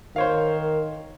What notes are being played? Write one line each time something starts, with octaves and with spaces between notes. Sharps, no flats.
D#3 A#4 C5 C#5 F5